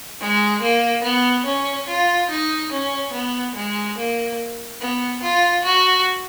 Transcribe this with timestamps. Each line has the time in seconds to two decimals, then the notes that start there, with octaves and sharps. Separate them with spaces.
0.20 G#3
0.62 A#3
1.04 B3
1.45 C#4
1.88 F4
2.29 D#4
2.72 C#4
3.13 B3
3.55 G#3
3.97 A#3
4.80 B3
5.22 F4
5.64 F#4